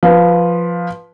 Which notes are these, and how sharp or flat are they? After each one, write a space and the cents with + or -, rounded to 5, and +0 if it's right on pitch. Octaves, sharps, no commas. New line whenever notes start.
F3 +0 B4 +0